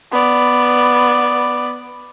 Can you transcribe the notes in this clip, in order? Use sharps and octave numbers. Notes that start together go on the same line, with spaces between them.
B3 D5